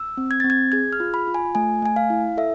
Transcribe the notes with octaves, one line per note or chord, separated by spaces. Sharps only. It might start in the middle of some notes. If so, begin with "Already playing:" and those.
Already playing: E6
C4
G#6
C4 A6
G#6
G#4 G#6
F6
F4
B5
F4
G#5
A3 G#5
A3 G#5
F5
E4
A4 E5